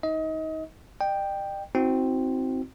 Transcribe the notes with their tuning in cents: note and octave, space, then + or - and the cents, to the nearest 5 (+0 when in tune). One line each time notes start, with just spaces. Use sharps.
D#4 +20 D#5 +30
D#5 -45 G5 +5
C4 +0 D#4 +45 F#4 -5